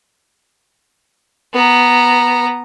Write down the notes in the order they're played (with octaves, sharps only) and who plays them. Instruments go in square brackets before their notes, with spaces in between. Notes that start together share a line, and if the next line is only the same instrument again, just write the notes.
[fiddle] B3 A#5